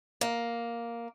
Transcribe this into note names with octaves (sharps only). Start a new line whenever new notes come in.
A#3